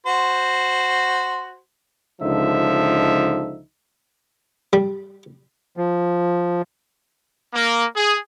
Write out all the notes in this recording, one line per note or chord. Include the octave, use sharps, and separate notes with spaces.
F#4 C5
C#2 D3 F3 D#4 E5
G3
F3
A#3
G#4